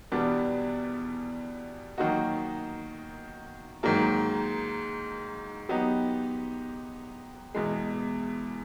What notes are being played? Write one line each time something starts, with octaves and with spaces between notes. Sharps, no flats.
E2 B2 G3 B3 D4
D#3 F#3 A#3 D#4 F#4
G#2 D#3 F#3 A#3
F#3 B3 D#4 G4
E2 B2 G#3